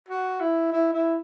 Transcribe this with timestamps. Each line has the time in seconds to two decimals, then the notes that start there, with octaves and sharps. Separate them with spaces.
0.09 F#4
0.40 E4
0.72 E4
0.93 E4